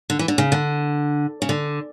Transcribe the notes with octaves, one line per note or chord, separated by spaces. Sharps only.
D3
E3
D3
C#3
D3
C#3
D3